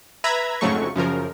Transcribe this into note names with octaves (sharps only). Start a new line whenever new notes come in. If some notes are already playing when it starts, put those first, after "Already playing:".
B4 E5 A#5 B5 G#6
F2 G#2 C#3 F#3 A3 C#6
F#2 C#3 F3 A#4